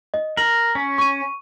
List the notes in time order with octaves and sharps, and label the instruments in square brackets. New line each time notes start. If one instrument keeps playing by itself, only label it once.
[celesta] D#5
[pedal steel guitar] A#4 [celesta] F#7
[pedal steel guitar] C#4
[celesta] C#6 D#7